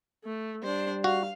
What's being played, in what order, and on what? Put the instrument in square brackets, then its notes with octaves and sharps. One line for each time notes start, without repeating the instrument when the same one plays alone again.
[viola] A3
[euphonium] G3 [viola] D4 C5
[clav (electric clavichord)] F#4 [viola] F5